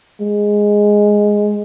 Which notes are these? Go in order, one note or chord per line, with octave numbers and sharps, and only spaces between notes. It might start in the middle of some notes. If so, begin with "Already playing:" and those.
G#3